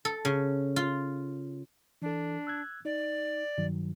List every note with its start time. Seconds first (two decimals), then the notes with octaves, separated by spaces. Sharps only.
0.05 A4
0.25 C#3
0.76 F4
2.02 E3 D4 A4
2.47 E6 F#6 G#6
2.85 D#4 D5
3.58 G2 D#3 F#3